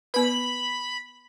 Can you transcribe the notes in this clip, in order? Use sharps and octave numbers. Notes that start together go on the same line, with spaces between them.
B3 B4 B5